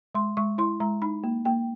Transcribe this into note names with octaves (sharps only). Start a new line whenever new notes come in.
G#3 C6
G#3 C#6
E4 C6
G#3 A#5
D#4 B5
A#3
A#3 G5